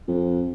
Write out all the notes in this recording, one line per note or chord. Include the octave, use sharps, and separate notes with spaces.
F2